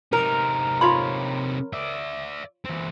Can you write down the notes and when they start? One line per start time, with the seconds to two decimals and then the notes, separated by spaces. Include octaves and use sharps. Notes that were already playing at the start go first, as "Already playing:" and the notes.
0.13 C3 D#4 A#4
0.81 F4 C#5 B5
1.73 D5 E5
2.65 E3 C4